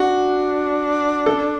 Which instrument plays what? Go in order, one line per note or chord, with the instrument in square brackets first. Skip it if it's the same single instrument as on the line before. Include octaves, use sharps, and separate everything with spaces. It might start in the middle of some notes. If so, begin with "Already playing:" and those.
Already playing: [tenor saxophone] D4 [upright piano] F#4
[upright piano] A4